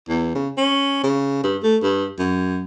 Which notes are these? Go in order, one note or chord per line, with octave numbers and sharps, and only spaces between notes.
E2
C#3
C#4
C#3
G2
A3
G2
F#2